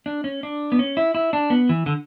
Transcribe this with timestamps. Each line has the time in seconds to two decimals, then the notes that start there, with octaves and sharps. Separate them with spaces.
0.06 D4
0.24 C#4
0.43 D4
0.72 B3
0.79 C#4
0.97 E4
1.15 E4
1.33 D4
1.50 B3
1.69 E3
1.86 D3